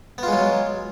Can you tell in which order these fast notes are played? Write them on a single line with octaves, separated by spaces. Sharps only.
B3 F4 G#3 F#3